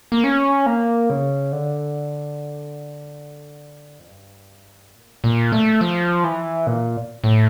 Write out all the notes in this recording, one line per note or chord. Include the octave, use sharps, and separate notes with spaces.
A#3
C#4
A#3
C#3
D3
F2
G2
A#2
A#2
A3
F3
E3
A#2
A2